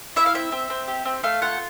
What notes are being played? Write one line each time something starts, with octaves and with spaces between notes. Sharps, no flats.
E4 E5
F5
C4 E5
C4
C4
G4
C4
A3 F5
F4 F#5